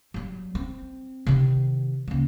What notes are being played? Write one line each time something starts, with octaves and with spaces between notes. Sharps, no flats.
F#3 G3
C4
C3 D#3
C#2 A#3